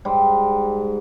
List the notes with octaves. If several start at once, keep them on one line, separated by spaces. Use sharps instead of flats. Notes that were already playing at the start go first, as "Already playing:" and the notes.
G#2 G3